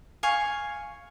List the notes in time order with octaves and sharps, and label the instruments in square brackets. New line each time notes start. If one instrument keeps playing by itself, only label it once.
[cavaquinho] F5 G#5 C#6